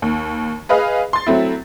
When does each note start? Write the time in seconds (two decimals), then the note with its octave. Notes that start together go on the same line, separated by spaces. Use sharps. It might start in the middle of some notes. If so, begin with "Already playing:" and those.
0.02 D#2
0.69 G#4 B4 D#5 F5
1.13 C6 A6
1.26 F#3 A3 C4 E4